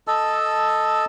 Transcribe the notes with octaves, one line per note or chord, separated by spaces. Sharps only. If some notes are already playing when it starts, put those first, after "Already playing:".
A4 D#5 A5 E6